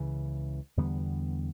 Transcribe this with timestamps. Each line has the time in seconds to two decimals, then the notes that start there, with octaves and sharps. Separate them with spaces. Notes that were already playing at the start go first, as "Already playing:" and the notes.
Already playing: C#2 C#3 E3
0.77 E2 D3 G3 B3